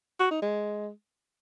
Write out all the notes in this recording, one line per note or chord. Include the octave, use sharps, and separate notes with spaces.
F#4
D#4
G#3